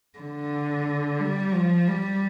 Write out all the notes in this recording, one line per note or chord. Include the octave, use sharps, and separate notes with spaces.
D3
G3
F3
G3